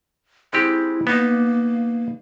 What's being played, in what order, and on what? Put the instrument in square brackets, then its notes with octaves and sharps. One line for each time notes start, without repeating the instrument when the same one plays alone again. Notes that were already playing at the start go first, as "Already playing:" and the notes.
[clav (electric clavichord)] G#3 C4 G4 [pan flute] E4
[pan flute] A#3 [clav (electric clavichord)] B3 D#4